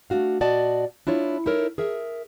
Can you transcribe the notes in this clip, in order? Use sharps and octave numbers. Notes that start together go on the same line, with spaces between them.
A3 D4 F#4 F5
A#2 F#4 D5 D#5 A5
D4 E4 F4 C#5
D#4 E4 A4 A#4 C#5
G#4 A#4 E5